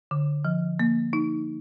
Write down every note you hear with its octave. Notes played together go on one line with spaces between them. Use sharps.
D3
F3
A#3
D#4